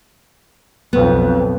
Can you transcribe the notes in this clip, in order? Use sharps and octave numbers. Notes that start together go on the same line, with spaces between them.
B1 F2 B3